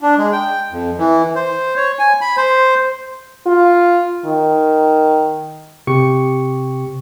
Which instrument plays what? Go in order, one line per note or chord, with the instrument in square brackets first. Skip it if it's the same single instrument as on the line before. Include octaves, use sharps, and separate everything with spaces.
[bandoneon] D4
G#3
G5
F2
E3
C5
C#5
G#5
B5
C5
[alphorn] F4
D#3
[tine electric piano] C3 G4 C#6 C#7